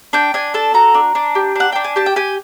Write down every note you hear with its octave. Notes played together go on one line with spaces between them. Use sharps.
D4 G5
D4 G#5
A4 A5
F#4 A#5
D4
D4
G4
D4 F#5
D4 G5
G#5
G4 A5
G5
G4 G#5